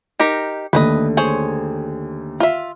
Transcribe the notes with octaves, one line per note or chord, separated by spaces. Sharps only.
D#4 G4 A#4
D#2 D3 A3 B4 C5 D#5
G#4 C5 C#5
F4 E5